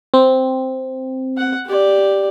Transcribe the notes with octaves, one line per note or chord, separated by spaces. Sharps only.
C4
F#5
G4 D5